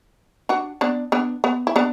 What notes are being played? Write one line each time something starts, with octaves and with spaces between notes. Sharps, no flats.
D4 F#4
B3 D4
B3 D4
B3
E4
B3 D4